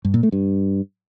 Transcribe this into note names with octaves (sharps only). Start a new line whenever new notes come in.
G2
A#2
A3
G2